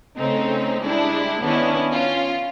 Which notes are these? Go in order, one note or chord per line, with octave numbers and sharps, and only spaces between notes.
C#3 A3 C4 C#4 D#4
G3 G#3 D4 E4
D#3 B3 C#4 D4 E4
C#4 F4